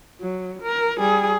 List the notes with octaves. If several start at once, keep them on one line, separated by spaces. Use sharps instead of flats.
F#3
A#4
G3 G#4